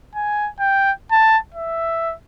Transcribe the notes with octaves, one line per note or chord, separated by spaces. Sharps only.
G#5
G5
A5
E5